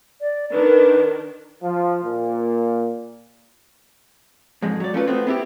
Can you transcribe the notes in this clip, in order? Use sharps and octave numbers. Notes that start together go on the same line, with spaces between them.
D5
D#3 D4 B4
F3
A#2
F2 G#2 G#3
F#3 D5
A3 C#4 F4 A4 B4
A3 B3 C4
B3 C4 E4 F4 G4